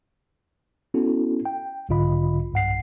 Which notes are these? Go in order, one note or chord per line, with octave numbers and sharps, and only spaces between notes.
B3 C#4 E4 F#4 A4
G5
B1 G#2 D3 F4 D#5 B5
B1 G2 F#5 C7